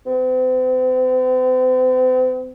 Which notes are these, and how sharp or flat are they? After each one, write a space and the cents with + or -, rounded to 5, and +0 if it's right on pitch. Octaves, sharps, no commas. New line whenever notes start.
C4 -40